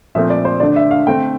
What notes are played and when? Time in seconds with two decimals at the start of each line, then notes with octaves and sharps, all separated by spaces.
0.15 A#2 F3 A3 C4 E5
0.30 D5
0.45 C5
0.60 D3 A3 D4 D5
0.76 E5
0.91 F5
1.07 D3 A3 C4 G5